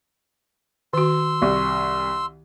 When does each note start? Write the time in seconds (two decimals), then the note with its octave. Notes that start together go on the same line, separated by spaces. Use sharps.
0.93 D#3 F#4 C6 E6
1.42 C2 C#6